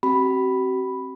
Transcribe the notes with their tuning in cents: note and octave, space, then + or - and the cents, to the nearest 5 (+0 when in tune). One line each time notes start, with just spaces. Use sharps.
C4 +20 F#4 +45 B5 +0